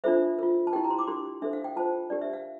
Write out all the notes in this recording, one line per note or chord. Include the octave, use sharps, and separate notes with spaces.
D4 F4 A4 C5 E5
F4 A#4
A5
E4 G4 A#4 G5
A#5
C6
D6
D4 G4 A#4 C6
D4 A4 C5 E5
F5
G5
F4 C5 A5
D4 G4 A#4 D5
E5
F5